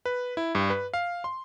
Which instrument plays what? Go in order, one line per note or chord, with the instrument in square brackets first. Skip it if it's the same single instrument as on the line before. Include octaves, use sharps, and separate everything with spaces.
[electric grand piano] B4
E4
G2
B4
F5
C6